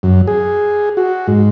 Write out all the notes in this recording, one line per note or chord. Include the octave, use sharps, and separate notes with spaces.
F#2
G#4
F#4
G#2